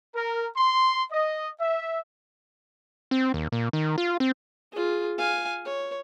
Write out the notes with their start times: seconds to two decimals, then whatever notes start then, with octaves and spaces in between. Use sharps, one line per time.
0.14 A#4
0.56 C6
1.11 D#5
1.60 E5
3.11 C4
3.34 D#2
3.52 A#2
3.73 D#3
3.98 F4
4.20 C4
4.72 F4 G#4
5.18 F5 G#5
5.65 C#5